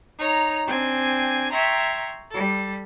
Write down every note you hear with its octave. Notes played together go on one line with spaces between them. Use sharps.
D#4 C#5 A#5
C4 D4 G5 G#5
E5 G5 A#5 C6 C#6 G#6
G3 A4